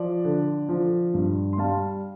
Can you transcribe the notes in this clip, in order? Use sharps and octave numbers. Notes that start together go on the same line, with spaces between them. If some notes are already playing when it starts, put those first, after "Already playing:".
Already playing: F3 D5
D3
F3
G2
C6
G3 F5 A5